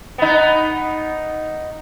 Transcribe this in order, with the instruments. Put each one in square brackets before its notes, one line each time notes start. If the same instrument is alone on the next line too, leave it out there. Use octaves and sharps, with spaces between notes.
[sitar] B3 D#4